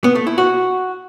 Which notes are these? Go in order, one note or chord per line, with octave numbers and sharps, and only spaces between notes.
B3
A3
E4
F#4